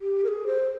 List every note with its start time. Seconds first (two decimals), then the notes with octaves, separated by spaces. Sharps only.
0.01 G4
0.24 A#4
0.28 G#4
0.47 C5